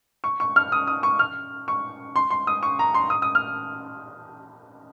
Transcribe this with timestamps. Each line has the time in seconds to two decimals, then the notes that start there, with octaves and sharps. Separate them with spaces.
0.24 C#6
0.40 C#6
0.56 F6
0.72 D#6
0.87 D#6
1.03 C#6
1.19 F6
1.68 C#6
2.16 C6
2.30 C6
2.47 D#6
2.63 C#6
2.79 A#5
2.94 C6
3.10 D#6
3.22 D#6
3.35 F6